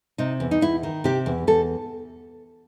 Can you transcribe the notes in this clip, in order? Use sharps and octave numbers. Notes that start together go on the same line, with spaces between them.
C3 D#4
E2
D#4
E2 E4
D#3
C3 G4
E2
E2 A4